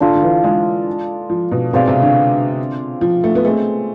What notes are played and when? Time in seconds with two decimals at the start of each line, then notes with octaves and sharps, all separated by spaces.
0.01 D3 D4 F4 A4
0.15 D3
0.22 E3
0.44 G#3
1.30 F3
1.51 B2
1.73 B2 C4 G#4 D5 F5
1.88 C3
2.02 D3
3.01 F3
3.24 A3
3.35 B3
3.44 G#3 A3 C4 G#4